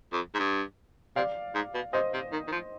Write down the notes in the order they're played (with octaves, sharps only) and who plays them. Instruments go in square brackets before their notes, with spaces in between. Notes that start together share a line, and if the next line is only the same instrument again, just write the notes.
[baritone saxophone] F2
G#2
G2
[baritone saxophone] C3 [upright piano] D5 F5
[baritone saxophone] G#2
B2
[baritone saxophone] C3 [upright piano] C5 D#5
[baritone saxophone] C3
D#3
D#3
F3